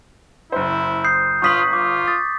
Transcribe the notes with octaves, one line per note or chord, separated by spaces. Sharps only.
F#1 E4 C5
D#6 G6 C7
G1 F4 C#6 D#6 B6 F#7
F4 D6
D#6 A6